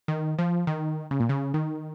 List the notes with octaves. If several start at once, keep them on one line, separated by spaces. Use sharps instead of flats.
D#3
F3
D#3
C#3
A#2
C#3
D#3